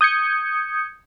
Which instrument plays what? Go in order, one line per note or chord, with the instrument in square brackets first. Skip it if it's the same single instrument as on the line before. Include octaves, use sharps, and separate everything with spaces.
[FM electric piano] D#6 G6 G#6 C#7